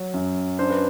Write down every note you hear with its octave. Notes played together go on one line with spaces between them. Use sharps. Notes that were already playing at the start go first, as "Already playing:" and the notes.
Already playing: F#3
F#2
D4 C5
B4